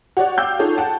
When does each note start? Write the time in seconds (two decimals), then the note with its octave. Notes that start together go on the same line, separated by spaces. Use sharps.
0.17 F#4 G4 C#5 D5 F#5
0.38 F5 G5 D6 E6 G6
0.59 D#4 F4 G#4 A4 C#5
0.78 F#5 G5 A5